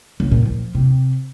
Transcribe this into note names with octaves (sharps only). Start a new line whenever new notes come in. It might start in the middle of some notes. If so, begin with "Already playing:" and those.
C#2
A#2
F3
C3